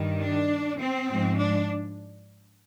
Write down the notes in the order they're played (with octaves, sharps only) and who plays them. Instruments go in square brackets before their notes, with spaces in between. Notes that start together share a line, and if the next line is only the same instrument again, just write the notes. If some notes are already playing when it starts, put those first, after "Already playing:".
Already playing: [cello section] G2 D#3 G3
D4
C4
G#2 F3 G#3
D4